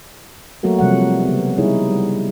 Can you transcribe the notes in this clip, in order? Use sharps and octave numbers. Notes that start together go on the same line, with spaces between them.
F#3 A3 A#3 F#4 A#4
C3 F3 G3 F#5
C#3 B3
G3 D#4 E4 G#4 C#5
G3